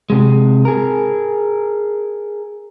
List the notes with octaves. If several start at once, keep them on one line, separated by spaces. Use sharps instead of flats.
C3 G#3
G#4 A#4